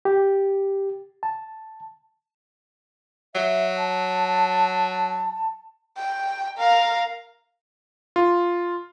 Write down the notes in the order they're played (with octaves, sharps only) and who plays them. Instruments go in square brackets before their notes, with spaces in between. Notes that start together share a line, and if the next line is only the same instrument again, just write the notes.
[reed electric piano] G4
A5
[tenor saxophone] F#3 [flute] E5
[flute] A5
[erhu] G5
[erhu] A#4 [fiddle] F5
[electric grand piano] F4